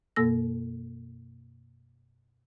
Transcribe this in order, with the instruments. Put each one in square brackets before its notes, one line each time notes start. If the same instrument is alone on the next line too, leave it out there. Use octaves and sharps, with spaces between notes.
[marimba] F#2 B2 A#3 A4 E6 A#6